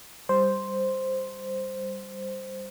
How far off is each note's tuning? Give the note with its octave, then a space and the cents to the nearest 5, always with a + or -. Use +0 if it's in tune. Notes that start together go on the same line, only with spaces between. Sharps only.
G3 +0 C5 +0